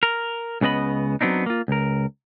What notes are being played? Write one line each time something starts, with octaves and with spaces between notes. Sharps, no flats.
A#4
C#2 C#3 B3 D#5 B5
F#3 B3 C4 D4 D#4
A#3 F4
C#2 A#4